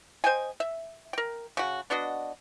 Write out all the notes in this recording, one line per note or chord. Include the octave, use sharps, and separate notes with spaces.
C5 D#5 G5 G#5
E5
A#4 G5
C#3 F#4
B3 D4 F#4 D#5